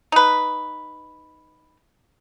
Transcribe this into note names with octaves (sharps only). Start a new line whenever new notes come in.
D#4 B4